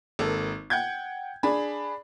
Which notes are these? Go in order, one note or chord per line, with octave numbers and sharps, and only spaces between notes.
G#1 A#3 A4
F#5 G5 G6 G#6
D4 G#4 B5